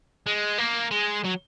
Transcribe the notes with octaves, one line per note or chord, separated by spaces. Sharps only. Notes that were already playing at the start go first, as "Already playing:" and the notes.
G#3
A#3
G#3
F#3